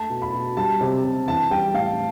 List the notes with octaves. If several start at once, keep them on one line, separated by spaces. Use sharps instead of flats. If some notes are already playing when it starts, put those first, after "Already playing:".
Already playing: A3 A5
B2
B5
B2
G3 A5
C3
C3
E3 A5
G3 G5
A2 F5